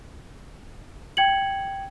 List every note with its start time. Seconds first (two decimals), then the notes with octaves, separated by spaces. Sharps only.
1.17 G5 G#6 C#7 F#7